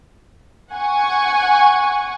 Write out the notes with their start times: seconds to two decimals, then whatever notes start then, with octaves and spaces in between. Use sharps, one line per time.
0.73 F#5 G#5 C#6